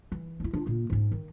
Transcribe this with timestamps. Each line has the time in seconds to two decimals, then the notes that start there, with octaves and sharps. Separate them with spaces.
0.12 E3
0.40 D4 E4
0.53 D4 F4
0.67 A#2 A#3
0.90 G#2 C#4
1.12 D#3